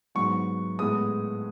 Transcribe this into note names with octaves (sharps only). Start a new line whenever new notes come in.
G#2 F#3 B3 C#6
A2 G#3 B3 D#6